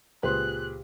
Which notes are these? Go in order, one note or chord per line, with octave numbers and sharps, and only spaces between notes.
C#2 A#2 G4 G#4 B4 C5 C6 F#6